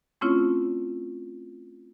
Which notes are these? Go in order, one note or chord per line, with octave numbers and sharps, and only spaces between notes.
A3 C4 C#4 E4 F4 C#5